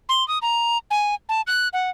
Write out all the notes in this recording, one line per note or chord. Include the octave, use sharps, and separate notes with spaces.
C6
D#6
A#5
G#5
A5
F#6
F#5